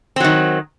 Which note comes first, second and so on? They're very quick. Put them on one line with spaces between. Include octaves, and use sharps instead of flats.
C4 F#3 D#3